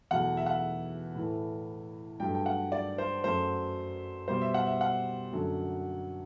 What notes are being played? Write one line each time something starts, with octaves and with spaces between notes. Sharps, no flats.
E2 B2 F#3 A3 F#5
E5
F#5
E5
A2 E3 A3
G2 F#3 A3 G5
G5
F#5
D5
C5
F#2 F#3 A3 C5
B2 G3 C5
E5
F#5
E5
F#5
F#2 D3 F#3 A3